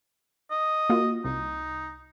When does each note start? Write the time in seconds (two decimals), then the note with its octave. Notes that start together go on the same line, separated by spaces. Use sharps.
0.51 D#5
0.90 A#3 F4 F#4
1.24 C2 D#4